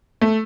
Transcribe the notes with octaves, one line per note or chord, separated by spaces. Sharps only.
A3